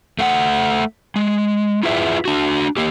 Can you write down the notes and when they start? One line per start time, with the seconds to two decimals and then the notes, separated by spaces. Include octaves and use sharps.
0.19 A3 F5 F#5
1.16 G#3
1.83 E4 F4 G#4 B4 E5
2.25 D4 F#4
2.77 A#3 G4